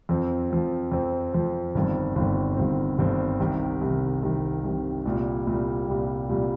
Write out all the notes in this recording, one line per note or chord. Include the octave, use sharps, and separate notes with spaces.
F2 F3 C4
F2 F3 C4
F2 F3 C4
F2 F3 C4
G1 G2 D#3 C4
G1 G2 D#3 C4
G1 G2 D#3 C4
G1 G2 D#3 C4
C2 C3 D#3
C2 C3 D#3
C2 C3 D#3
C2 C3 D#3
C2 A#2 G3
C2 A#2 G3
C2 A#2 G3
C2 A#2 G3